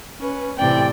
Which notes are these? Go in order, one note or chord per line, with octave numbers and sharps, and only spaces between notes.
C#4 B4
A2 C3 E3 D5 G5